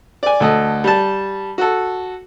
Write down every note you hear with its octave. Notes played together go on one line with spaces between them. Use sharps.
D5 G#5
D2 A4 D#5
G3 A5
F#4 A4